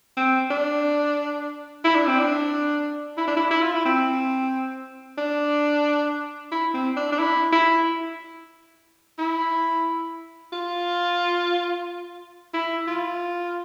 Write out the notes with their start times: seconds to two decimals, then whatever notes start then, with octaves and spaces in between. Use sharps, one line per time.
0.17 C4
0.51 D4
1.84 E4
1.96 D4
2.07 C4
2.20 D4
3.18 E4
3.28 D4
3.37 E4
3.51 E4
3.62 F4
3.73 E4
3.85 C4
5.18 D4
6.52 E4
6.74 C4
6.97 D4
7.13 D4
7.19 E4
7.53 E4
9.19 E4
10.53 F4
12.54 E4
12.88 F4